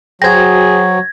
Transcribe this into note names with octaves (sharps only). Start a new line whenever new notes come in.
F#3 F#4 G#4 C5 G5 G#6 A#6